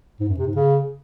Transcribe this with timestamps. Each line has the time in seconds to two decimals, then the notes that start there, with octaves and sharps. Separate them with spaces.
0.20 G#2
0.29 F#2
0.38 C3
0.47 G#2
0.56 C#3